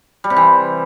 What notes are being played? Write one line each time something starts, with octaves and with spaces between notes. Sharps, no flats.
G3
C3
E3